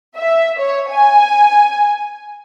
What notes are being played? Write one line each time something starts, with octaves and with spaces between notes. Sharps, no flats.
E5
C#5
G#5